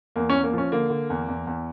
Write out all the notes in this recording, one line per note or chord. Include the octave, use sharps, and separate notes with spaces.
E2 A#3
C#4
E2
A#3
F3 C#4
D3 A#3
D3
E2
E2
E2